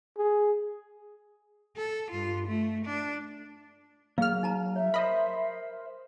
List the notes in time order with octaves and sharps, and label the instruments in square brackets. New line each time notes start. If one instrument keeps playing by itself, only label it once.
[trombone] G#4
[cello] A4
G2 F4
A3
D4
[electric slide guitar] F#3 [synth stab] A#3 F6 [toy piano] G#4 F5
[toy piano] D#4 A5 A#5
[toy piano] C#5 [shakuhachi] E5
[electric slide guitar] A#4 C5 [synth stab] D#5 B5